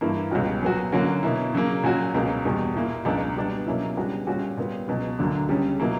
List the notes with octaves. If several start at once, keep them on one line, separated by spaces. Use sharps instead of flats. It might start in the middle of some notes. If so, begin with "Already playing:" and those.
G2 E3 A#3 E4
C#2 B2 G3 C#4 F#4
A#2 F#3 B3 F#4
D3 F#3 A#3 C#4 F#4
B2 A#3 E4
C#3 F#3 A#3
A#2 F#3 C#4 F#4
C#2 B2 A#3
E2 B2 G3
A#2 A#3 E4
C#2 B2 F#3 A#3 D4
B2 G3 B3 D4
B2 F#3 A#3 C#4 E4
C#3 G3 B3 D4 F#4
A#2 G3 C#4 F#4
A#2 G3 B3
C#2 B2 F#3
D2 D3 F#3 A#3 D4
C#2 C#3 G3 C#4
B2 F#3 A#3 E4